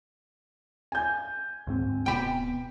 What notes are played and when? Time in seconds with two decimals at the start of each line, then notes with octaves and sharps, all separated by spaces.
0.92 G#5 G6
1.67 D2 G#2 C4
2.06 D1 B2 B3 G5 B5